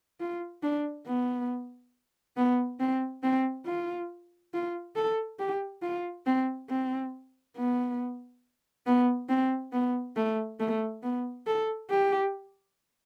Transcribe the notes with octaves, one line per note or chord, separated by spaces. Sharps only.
F4
D4
B3
B3
C4
C4
F4
F4
A4
G4
F4
C4
C4
B3
B3
C4
B3
A3
A3
B3
A4
G4